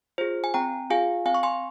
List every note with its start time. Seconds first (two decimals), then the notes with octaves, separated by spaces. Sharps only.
0.18 F4 G#4 C5
0.44 G#5
0.54 C4 G5 A#5
0.90 F4 G#4 F5 G#5
1.25 C4 F5 G#5
1.34 C#6
1.43 G#5 C6